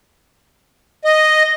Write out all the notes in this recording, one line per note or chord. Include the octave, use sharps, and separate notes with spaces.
D#5